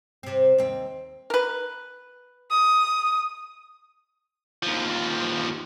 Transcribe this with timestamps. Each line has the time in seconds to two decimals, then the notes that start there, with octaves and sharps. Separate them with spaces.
0.23 C3 C4
0.58 D#2 C4
1.30 A#4 B4
2.51 D#6
4.63 D#2 F3